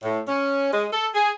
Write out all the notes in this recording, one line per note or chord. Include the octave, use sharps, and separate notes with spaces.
A2
C#4
G#3
A4
G#4